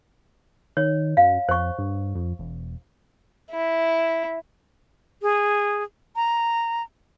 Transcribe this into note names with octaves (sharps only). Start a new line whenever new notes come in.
D#3 C#5
F#2 F5
F2 C5 C#6
G2
F2
E1
E4
G#4
A#5